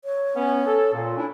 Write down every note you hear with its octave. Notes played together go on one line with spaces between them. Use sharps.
C#5
B3 C#4
A4
A#2
C#4 D4 E4